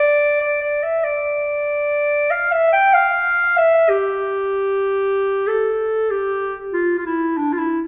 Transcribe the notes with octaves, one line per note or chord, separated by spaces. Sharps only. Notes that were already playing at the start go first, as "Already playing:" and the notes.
Already playing: D5
D5
D5
E5
D5
F5
E5
G5
F5
E5
G4
A4
G4
F4
F4
E4
D4
F4
E4